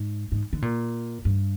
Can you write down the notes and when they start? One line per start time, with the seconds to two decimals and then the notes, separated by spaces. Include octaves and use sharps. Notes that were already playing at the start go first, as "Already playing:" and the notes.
Already playing: G#2
0.32 G#2
0.53 D3
0.62 A#2
1.25 G2